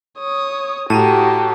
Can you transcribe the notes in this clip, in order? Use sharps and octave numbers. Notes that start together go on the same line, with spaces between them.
C#5 D#6
A2 F#4 G4 A5 A#5 D#7